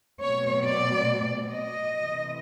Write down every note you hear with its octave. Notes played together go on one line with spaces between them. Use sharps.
B2 F#3 A3 C4 C#5
D5
D#5
C3 E3 A3